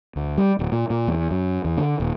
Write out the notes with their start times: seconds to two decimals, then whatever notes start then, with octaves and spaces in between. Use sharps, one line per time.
0.16 D2
0.38 G3
0.59 D1
0.72 A#2
0.90 A#2
1.07 E2
1.31 F#2
1.65 E2
1.78 D3
2.00 D#1